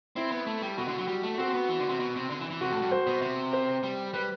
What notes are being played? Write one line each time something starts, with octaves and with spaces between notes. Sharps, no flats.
C4 E4
B3
A3
G3
B2 F#4
D3
F#3
G3
A3
C4 F#4
B3
E3
D3
C3
B2
C3
D3
E3
E3
C3 F#4
A2
G2
C5
B2
C3
C5
G3
G3 B4